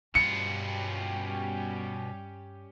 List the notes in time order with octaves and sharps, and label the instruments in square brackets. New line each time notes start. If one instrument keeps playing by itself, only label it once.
[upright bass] G2 [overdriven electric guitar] B2 F4 [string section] G3 C#4 G4 [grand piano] C#7